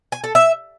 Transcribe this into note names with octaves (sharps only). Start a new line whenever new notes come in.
G#5
A4
E5